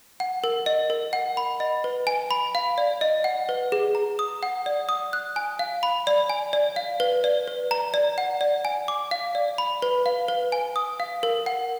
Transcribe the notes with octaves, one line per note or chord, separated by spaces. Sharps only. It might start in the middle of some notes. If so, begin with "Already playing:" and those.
F#5
A#4
D#5
A#4
F#5
B5
D#5
B4
G#5
B5
F5
D5
D#5
F#5
B4
G#4
A#5
D#6
F#5
D5
D#6
F#6
G#5
F5
B5
D5
G#5
D5
F5
B4
D5
B4
A#5
D5
F#5
D5
G#5
D6
F5
D5
B5
B4
F5
B4
G#5
D#6
F5
A#4
F#5